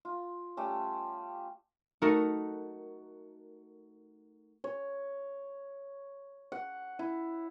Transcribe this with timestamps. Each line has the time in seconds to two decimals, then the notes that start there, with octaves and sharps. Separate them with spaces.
0.05 F4
0.57 G3 A3 C#4
2.02 A3 D#4 F#4 A4 A#4
4.64 C#5
6.52 F#5
6.99 E4